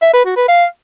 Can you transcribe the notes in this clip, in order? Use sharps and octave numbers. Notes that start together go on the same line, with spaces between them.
E5
B4
F#4
B4
F5